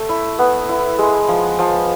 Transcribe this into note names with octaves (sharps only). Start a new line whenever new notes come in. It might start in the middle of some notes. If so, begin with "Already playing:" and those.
Already playing: A3
E4
B3
E4
G#3
F3
F3